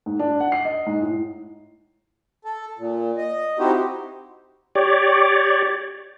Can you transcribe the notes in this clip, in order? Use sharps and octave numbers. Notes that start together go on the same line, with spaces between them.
G#2
D4
F#5
C7
D#5
G#2
A2
A4
A#2
D#5
C4 D#4 E4 F#4 G4 C5
G4 C#5 D5